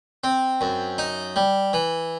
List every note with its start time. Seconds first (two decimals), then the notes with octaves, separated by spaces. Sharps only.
0.24 C4
0.61 F#2
0.98 D#4
1.36 G3
1.73 E3